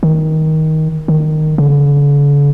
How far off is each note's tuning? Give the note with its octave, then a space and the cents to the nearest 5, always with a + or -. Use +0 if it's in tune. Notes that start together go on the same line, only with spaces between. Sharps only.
D#3 +15
D#3 -10
D3 -45